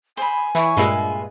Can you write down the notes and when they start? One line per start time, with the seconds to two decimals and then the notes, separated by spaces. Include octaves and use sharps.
0.17 C5 G#5 B5
0.55 E3 E4 C#5 C#6
0.77 G2 A#2 G#3 F4 B4 E5